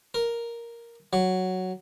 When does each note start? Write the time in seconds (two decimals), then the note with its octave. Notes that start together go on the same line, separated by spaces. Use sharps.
0.14 A#4
1.13 F#3